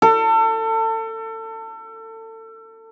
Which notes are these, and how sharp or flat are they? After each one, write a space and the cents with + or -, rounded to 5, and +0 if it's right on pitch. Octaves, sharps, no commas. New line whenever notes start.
A4 +30